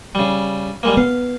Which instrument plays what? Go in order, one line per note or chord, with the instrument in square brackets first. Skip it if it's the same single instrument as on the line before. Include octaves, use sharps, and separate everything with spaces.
[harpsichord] C#3 G3
G3 G#3 A#3
[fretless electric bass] B3 [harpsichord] F5